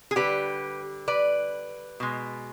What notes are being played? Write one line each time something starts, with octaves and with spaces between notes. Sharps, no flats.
G#4
D3 G3 G4 B4
B4 D5
B2 G#3